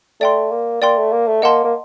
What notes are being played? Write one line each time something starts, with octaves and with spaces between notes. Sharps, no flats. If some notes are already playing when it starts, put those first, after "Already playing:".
A3 D5 G5 C6
A#3
A#3 D5 G5 C6
A3
A#3
A3
A#3 D#5 F#5 A5 C6
A#3